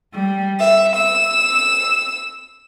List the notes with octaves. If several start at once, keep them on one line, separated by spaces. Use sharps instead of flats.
G3
E5
E6